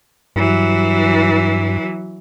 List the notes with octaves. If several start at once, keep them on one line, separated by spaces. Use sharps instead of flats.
G2 E3 F#3